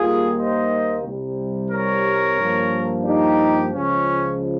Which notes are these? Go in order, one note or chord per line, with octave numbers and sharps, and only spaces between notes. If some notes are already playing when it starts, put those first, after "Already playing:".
Already playing: D#2 D#3 G3 A#3 F4 G#4
C5 D#5
C2 C3 G3
A#4 C#5
G2 F3 A#3
D#4 G4
C#2 C#3 F3 C#4